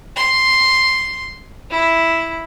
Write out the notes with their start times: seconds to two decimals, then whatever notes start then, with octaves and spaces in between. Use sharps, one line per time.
0.16 C6
1.70 E4